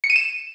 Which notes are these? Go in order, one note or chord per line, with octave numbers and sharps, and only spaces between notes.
C#7
D#7
E7